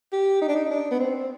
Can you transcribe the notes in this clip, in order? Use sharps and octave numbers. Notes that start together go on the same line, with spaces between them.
G4
D#4
D4
D#4
D4
B3
C4